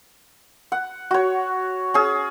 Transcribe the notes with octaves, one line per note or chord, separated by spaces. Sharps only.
F#5
F#4 C#5
C#4 G#4